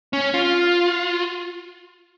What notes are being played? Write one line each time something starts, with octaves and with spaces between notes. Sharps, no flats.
C#4
F4